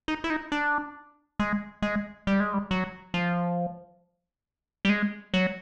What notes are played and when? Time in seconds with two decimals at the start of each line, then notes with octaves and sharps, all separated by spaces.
0.08 D#4
0.24 E4
0.30 D#4
0.52 D4
1.40 G#3
1.82 G#3
2.27 G3
2.40 G#3
2.54 G3
2.71 F#3
3.14 F3
4.85 G3
4.89 G#3
5.34 F#3